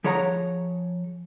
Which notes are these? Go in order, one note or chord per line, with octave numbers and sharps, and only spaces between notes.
F3 G#4 C#5 F#5 A#5